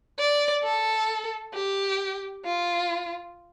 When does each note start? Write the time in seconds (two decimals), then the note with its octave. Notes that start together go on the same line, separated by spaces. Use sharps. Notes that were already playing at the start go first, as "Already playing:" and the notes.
0.19 D5
0.63 A4
1.54 G4
2.45 F4